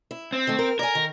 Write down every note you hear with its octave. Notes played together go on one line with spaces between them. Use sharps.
E4
C4
D#3 A3
A#4
A#4 D5 G#5
D#3